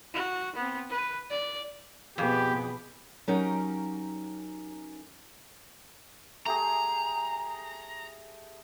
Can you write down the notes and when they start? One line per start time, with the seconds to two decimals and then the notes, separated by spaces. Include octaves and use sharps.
0.14 F#4
0.56 B3 C4
0.90 B4
1.30 D5
2.18 F2 B2 B3 G4 G#4 B4
3.28 F#3 C#4 D#4 G4 A#4
6.46 A3 G4 G#4 A#5